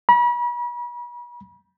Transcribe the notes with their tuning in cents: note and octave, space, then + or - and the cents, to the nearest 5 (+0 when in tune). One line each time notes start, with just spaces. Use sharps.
B5 -40